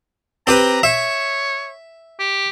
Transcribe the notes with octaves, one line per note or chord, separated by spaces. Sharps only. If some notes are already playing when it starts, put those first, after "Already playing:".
C4 G4 B4 A#5
C#5 E5
G4